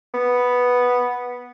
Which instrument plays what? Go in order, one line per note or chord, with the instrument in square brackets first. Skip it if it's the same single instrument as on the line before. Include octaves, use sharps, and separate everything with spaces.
[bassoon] B3